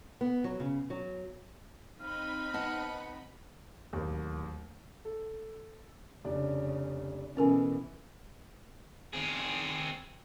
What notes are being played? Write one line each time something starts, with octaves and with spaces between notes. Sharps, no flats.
B3
F#3
C#3
F#3
C4 D#4 F5 B5
B3 D#5 F#5 A5
D1 D#2
A4
F1 C#3 D4 D5
B2 E3 C#4 A4 A#4 G#5
C4 G#4